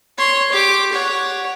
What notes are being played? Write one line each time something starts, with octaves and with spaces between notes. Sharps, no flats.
C#5 C6
G4 D6
C#5 F#5